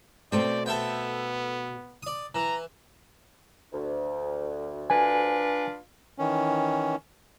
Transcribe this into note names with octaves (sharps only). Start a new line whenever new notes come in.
B2 A3 C4 D5 G5
B3 A4 E5 G5
D5 D#6
E3 A#5
D2
D4 F4 B4 G#5
D#3 E3 C#4